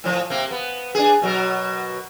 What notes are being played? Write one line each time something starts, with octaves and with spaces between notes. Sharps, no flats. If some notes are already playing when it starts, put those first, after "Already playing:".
A2 F3
C3 A#3
B3
D4 G#4
B2 F#3 A#4